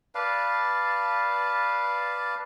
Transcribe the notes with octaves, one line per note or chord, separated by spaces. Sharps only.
B4 D5 F5 A5